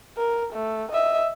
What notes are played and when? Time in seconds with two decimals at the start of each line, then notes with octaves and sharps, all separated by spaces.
0.17 A#4
0.53 A3
0.92 D#5 E5